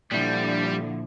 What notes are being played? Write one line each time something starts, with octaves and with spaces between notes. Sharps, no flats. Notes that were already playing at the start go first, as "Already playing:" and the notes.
A#2 D3 F3 G3 E4